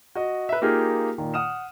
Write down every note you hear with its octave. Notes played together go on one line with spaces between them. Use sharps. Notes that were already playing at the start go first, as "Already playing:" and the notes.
F#4 D#5
B4 E5
A#3 D#4 F4 G4 G#4 A#4
A#2 D#3
F#5 D#6 F6 E7